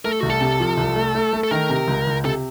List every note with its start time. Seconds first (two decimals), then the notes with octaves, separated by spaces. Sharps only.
0.05 A3 A#4
0.12 A4
0.20 C2 F#4
0.30 A4
0.41 C3
0.60 F3
0.77 C2
0.96 A3
1.15 A3
1.33 A3
1.44 A4
1.51 D#3 A#4
1.70 C3
1.87 C#2
2.07 C#2
2.25 C3 A4